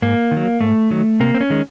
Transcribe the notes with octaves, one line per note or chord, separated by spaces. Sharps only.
G#2 A#3
D#3
F#3
G#2 A3
D#3 F#3
C3 A#3
C4
C#4
D#3 G#3